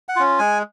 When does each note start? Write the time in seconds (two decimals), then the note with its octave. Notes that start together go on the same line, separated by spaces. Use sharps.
0.09 F#5
0.16 C#4 F4
0.39 G#3 G#5